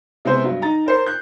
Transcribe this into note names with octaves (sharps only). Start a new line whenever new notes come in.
C3 G#3 B3 E4 G#4 C5
G2 F#3
D#4 A#5 A6
A#4 C5 C7
F#6 G6